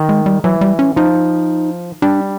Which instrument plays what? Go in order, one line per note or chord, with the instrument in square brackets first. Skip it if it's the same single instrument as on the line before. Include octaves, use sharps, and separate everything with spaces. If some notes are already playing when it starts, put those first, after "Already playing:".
Already playing: [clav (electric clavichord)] D#3
[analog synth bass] G#3
G3
[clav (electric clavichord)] E3 [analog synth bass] F#3
[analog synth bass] G3
C#4
[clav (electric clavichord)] F3 [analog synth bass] D#4
[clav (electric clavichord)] G3 [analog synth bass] D4